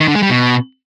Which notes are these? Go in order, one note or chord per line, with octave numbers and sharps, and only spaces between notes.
D#3
D3
G#3
G3
B2